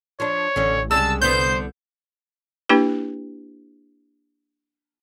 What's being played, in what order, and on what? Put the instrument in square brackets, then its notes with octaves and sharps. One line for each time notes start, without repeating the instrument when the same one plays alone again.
[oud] F3 D4 [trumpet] C#5
[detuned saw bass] A1 [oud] D3 C#4
[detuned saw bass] C2 [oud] C#3 G3 G#3 [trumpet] A5 [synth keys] E6
[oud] D3 B3 [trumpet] C5 [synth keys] G6
[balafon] A#3 D4 E4 G4 B4